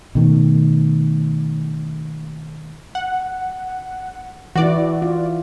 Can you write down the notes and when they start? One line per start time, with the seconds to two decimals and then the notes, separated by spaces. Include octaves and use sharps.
0.15 B2 D#3 A3
2.95 F#5
4.55 E3 E4 F#4 D5
5.02 F4